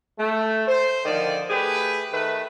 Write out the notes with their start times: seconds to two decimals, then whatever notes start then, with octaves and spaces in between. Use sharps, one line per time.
0.18 A3
0.67 C5
1.05 D3 D#3 F3 D5
1.50 A3 G4 G#4 B4
2.12 D#3 A3 B4